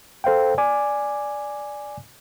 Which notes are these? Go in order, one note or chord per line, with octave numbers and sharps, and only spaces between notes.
A4 C5 F5 G5
D5 G#5 D6